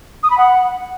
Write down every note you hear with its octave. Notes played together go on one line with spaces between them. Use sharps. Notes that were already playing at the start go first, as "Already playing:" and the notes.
D#6
B5
F#5